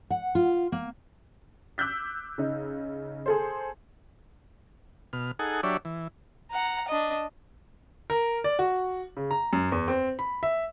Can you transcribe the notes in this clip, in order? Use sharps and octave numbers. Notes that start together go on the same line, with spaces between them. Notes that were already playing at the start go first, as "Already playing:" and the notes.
F#5
F4
A#3
D6 E6 F#6 G6 B6
C#3 D#4
G#4 A4 C5
B2 F6
D#4 G#4 A4 F#5 G#5
F#3 D4 G4 C#5 D5 E5
E3
F#5 A#5
D4 D#5
A#4
D5
F#4
C#3
A#5
F#2
E2
C4
B5
E5